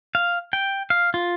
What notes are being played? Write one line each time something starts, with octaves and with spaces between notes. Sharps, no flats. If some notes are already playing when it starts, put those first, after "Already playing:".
F5
G5
F5
F4